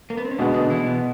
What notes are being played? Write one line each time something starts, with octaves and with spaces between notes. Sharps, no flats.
A#3
B3
C4
C#4
B2 D3 G#3 B3 D4
D3 D4
E3 E4
B2 B3